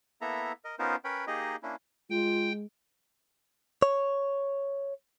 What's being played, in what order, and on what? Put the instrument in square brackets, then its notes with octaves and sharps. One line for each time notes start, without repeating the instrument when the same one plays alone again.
[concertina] A#3 B3 E4 A4 E5 A#5
A#4 D#5
B3 C#4 D#4 F4 A#4 C5
C#4 A#4 B4 C#5 G5 B5
A#3 D#4 G4 G#4 D#5
A#3 C#4 D4 E4
[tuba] G#3 [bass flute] F4 [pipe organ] G5
[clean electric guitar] C#5